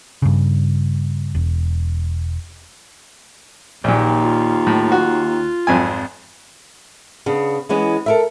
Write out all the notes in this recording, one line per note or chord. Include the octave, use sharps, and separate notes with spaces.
G2 C#3
E1
A#1 D#2 A#2
F4
A2
F#4
G#1 F2 G#5
C#3 B3 D4
E3 G#3 B3 C#4
A4 A#4 E5